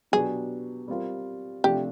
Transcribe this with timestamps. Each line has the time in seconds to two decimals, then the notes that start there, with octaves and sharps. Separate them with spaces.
0.12 B2 F#3 B3 D4 G4 G#4
0.88 G3 C4 F4 A#4
1.64 C3 F3 A3 D4 G4